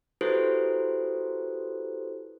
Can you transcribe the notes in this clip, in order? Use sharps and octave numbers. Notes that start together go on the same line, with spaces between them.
E4 F#4 G4 A4 B4 C5